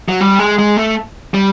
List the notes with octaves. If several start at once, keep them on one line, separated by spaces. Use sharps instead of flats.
F#3
G3
G#3
G#3
A3
G3